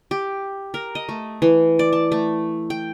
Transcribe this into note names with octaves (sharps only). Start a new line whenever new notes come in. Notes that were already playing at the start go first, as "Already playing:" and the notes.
G4
A#4
D#5
A3
E3
D5
A5
A3
G5